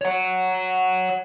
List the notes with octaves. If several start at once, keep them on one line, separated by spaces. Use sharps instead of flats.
C#5 F#5